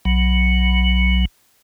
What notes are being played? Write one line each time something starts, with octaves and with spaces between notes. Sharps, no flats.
B1 F#3